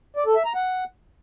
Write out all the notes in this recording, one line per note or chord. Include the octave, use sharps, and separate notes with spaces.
D5
A4
E5
A#5
F#5